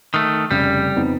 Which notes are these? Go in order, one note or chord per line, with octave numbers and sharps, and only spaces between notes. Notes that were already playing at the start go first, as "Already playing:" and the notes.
D#3 A3
F1 C#3 G3
F2 B3 D#4